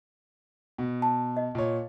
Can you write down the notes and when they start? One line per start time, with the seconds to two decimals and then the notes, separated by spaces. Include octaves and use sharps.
0.78 B2
1.02 A5
1.37 D#5
1.55 A#2 C#5